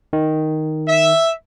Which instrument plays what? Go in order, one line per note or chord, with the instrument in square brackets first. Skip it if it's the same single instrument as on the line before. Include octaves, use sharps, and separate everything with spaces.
[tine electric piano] D#3
[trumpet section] E5